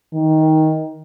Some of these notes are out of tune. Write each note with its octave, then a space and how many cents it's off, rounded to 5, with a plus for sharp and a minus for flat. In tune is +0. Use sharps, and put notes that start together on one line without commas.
D#3 +15